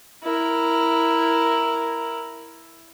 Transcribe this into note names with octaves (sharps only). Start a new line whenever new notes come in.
E4 A#4